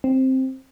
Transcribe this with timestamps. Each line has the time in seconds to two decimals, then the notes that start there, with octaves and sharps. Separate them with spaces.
0.04 C4